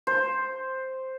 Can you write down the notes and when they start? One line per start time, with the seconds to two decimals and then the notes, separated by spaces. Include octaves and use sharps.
0.07 C5